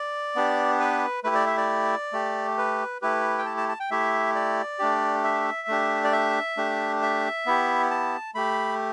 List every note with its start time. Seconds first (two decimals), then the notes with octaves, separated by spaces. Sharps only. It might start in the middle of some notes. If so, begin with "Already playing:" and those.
Already playing: D5
0.35 B3 D4 G4
0.80 B4
1.24 A3 E4 G4 B4
1.35 D5
1.47 E5
1.57 D5
2.13 A3 G4
2.58 B4
3.02 A3 E4 G4 B4
3.38 G5
3.46 A5
3.57 A5
3.69 A5
3.80 G5
3.91 A3 E4 G4 E5
4.35 D5
4.79 A3 D4 G4
5.24 E5
5.68 A3 D4 G4
6.04 D5
6.12 E5
6.57 A3 D4 G4
7.02 E5
7.46 B3 E4 G4
7.91 A5
8.35 A3 G4 B5